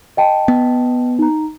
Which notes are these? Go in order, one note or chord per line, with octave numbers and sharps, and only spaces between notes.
D#5 G5 A5
B3
D#4 A#5